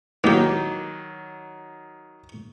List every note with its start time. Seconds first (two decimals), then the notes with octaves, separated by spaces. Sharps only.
0.24 D#3 F#3 A#3 G4